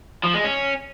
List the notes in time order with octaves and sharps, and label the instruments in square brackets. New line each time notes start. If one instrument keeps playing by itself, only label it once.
[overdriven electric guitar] F3
G#3
C#4